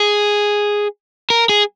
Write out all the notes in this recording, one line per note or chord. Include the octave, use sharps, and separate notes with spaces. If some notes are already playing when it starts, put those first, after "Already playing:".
Already playing: G#4
A#4
G#4